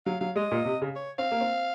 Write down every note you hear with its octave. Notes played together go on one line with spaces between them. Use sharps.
F#3 F5
F#3 F5
G#3 D#5
A#2
C3
C#3
C#5
C4 F5
A#3
C4